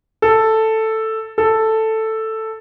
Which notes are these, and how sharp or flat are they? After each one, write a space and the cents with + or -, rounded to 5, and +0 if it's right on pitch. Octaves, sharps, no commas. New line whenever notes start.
A4 +5
A4 +5